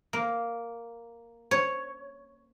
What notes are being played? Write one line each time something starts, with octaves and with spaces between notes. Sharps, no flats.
A#3
C#5